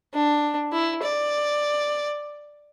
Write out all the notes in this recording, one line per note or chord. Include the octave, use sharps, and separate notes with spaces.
D4
E4
D5